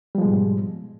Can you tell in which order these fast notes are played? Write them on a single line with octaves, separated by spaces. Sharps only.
G3 F3 G#3 B2 G#2